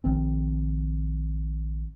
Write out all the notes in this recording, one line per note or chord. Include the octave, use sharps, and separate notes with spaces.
A#1 D#3 C4